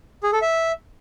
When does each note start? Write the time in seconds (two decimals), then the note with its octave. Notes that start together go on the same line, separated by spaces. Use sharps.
0.23 G#4
0.33 A4
0.42 E5